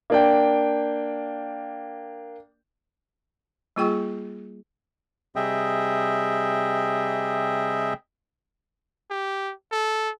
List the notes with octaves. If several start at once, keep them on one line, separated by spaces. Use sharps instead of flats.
A#3 D4 G5
G3 A#3 F4 G#4 G5 C#6
C3 G3 G#4 D#5 E5 G5
G4
A4